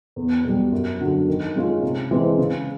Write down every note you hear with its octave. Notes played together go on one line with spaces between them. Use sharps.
E2
B2 G3
F#2
D3 F#3
D#3
G#3 C#4 F4
C3
E3 G#3 C4
C#3